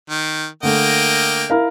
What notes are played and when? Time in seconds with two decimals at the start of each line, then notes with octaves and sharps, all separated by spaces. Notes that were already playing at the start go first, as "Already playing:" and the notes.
0.10 D#3
0.63 D3 A3 A#3 D#5 G5
1.50 E4 A#4 F5